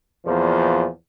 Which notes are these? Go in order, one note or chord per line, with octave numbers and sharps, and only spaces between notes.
E2 A#2 F3